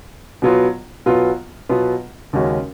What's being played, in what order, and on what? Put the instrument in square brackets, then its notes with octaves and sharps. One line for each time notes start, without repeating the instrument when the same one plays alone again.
[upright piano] B2 F#3 B3 F4
B2 F#3 B3 F4
B2 F#3 B3 F4
D#2 C#3 G#3 C#4 F#4